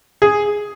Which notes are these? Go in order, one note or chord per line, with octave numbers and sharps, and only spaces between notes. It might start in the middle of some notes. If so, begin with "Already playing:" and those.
G#4